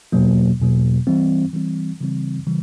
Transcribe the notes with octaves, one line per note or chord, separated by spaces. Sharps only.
E2 B2 F#3 A#3
E2 B2 F#3 A#3
E3 G3 C4
E3 G3 C4
C#3 E3 G3 C4
C#3 E3 G3